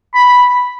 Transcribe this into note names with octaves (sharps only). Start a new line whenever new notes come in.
B5